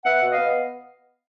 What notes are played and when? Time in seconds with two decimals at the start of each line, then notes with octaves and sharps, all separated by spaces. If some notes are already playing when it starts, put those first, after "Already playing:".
0.05 B3 E5 F#5
0.22 B2
0.30 D#5 F5
0.38 B3